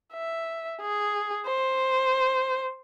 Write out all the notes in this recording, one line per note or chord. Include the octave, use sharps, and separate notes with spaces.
E5
G#4
C5